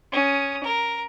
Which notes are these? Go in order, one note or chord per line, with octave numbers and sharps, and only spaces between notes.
C#4 D#6
A#4